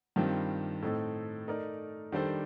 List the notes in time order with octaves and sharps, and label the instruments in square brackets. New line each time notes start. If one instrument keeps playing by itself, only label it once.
[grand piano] G2 D#3 G3 C4 F4
A2 A3 C4 D#4 A4
A3 D#4 A#4 D5
D#3 G3 D4 A4 C5